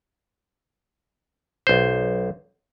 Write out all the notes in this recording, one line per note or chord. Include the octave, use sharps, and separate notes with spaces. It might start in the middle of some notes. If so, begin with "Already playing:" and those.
B1 C5